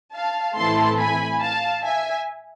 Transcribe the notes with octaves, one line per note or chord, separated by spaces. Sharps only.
F5 A5
A2 E3 A3 C4 E4 A5 C6
G#5 B5
F5 A5
E5 G#5